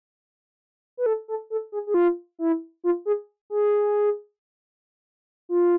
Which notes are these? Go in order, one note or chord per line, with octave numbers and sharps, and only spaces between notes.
B4
A4
A4
A4
G#4
G#4
F4
E4
F4
G#4
G#4
F4